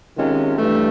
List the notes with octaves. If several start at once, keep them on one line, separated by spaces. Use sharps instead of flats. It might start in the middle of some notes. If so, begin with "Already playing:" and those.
C3 D#3 G#3 C#4 F4
G2 E3 A3